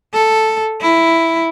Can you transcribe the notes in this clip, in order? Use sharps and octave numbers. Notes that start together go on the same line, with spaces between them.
A4
E4